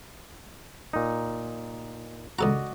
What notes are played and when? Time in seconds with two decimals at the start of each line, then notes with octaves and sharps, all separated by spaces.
0.93 A#2 D#4
2.39 C#2 F#4 A4 D5 D#5 A#5